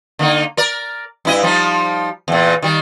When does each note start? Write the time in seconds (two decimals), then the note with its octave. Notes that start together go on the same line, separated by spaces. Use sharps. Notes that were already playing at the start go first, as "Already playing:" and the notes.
0.19 D3 A#3 D#4
0.57 A#4 D5
1.25 G2 E4 D#5
1.43 F3 G3 D#4
2.28 E2 A#2
2.62 D#3 G3